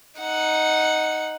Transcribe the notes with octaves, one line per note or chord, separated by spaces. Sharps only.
D#4 F#5